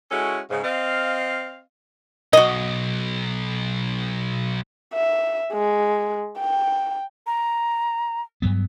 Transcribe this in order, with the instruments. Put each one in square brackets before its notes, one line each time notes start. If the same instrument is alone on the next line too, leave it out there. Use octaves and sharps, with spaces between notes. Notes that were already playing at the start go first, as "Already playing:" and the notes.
[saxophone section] G#3 C#4 E4 F#4 A4
G#2 C#3
C4 D#5 F5
[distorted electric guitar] B1 [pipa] F#4 D#5
[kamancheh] E5
G#3
G5
[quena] A#5
[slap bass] G2 F#3 B3